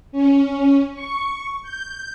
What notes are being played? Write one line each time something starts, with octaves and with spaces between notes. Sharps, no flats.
C#4
C#6
G6